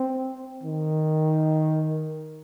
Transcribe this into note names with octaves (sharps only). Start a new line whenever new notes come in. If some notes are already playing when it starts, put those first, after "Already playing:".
Already playing: C4
D#3